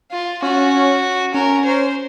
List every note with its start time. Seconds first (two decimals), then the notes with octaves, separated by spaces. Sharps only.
0.12 F4
0.42 C#4 F#4
1.34 C#4 A#4
1.65 C5